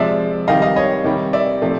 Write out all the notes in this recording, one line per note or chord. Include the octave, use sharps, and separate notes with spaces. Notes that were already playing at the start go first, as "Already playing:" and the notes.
Already playing: C3 F3 G#3 D5 E5
C3 D#3 G3 D#5 F5
D#5 F5
C#5 D#5
C3 D#3 G3
D5 E5
C3 F3 A3